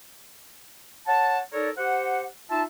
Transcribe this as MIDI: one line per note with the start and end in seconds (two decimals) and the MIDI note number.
1.08 1.40 73
1.08 1.40 78
1.08 1.40 81
1.53 1.70 63
1.53 1.70 69
1.53 1.70 70
1.53 1.70 73
1.53 1.70 74
1.78 2.26 67
1.78 2.26 72
1.78 2.26 78
2.50 2.63 63
2.50 2.63 65
2.50 2.63 76
2.50 2.63 81